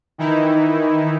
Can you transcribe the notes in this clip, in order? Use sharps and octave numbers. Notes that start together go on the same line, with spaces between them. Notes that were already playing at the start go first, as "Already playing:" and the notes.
D#3 E3 D#4 E4